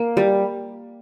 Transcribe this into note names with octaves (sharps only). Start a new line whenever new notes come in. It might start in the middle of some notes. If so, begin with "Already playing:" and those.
Already playing: A#3
G3